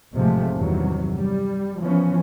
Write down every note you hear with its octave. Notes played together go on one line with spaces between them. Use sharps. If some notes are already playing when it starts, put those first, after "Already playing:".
A1 G#2 C3 F3 G#3 A3
E2 G2 C3 D#3 F#3
G3
E3 F3 B3 C#4